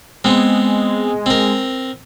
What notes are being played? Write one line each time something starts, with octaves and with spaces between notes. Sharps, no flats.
G#3 B3 C4
C4 A#4